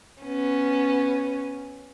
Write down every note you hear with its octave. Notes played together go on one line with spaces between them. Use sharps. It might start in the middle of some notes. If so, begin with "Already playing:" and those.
B3 C#4